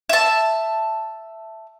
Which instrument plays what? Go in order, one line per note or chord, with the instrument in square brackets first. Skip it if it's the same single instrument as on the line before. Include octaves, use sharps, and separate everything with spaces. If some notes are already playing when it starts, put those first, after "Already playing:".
[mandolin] E5 A5